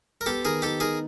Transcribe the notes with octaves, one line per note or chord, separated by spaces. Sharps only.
A#4
B3 G4 A4
D#3 G#4 A#4
D#4 G4 A4
D#4 G#4 A#4